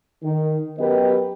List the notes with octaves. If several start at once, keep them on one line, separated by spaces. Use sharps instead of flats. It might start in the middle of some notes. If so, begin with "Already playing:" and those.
D#3
F#2 B3 G4 A#4 B4 D#5